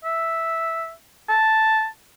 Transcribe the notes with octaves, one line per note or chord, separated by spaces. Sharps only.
E5
A5